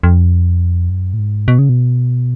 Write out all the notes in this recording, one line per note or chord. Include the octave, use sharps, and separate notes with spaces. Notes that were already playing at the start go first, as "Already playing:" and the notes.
F2
F#2
A2
G#2
B2
C#3
B2